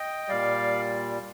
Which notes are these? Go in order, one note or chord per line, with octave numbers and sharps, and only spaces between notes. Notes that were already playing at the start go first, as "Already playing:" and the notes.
Already playing: D#5 G5
A#2 G3 D5 F5